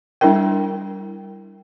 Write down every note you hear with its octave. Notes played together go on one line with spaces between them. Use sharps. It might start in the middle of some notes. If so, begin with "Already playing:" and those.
G3 D4 E4 A#4 G5